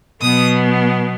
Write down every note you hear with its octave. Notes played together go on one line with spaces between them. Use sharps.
B2 F#3 B3 D#6